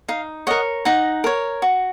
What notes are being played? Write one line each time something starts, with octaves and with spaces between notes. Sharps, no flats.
D#4 F5
A#4 C#5 D#5 F#5
D#4 F#5 A#5
A#4 C#5
F#4